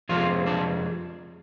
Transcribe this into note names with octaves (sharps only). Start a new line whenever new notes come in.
F2 C3 F3 G#3 F4
D4